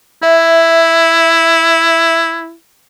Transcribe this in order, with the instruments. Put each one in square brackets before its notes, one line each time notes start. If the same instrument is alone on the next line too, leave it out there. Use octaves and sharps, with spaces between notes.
[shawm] E4 [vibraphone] E5